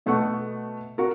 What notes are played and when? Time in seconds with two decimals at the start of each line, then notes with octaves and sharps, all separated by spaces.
0.06 B2 A3 B3 F#5 C#6
0.98 F#4 A#4